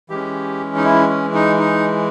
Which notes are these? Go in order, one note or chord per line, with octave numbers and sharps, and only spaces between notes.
E3 G#3 C#4 G4
D#4
E4
C#4
D#4
D#4